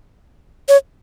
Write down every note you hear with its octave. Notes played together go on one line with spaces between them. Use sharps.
C#5